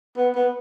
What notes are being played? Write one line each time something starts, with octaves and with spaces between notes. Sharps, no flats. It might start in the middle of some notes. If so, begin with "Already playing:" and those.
B3
B3